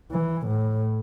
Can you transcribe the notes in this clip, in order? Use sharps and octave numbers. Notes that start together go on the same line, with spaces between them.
E3
A2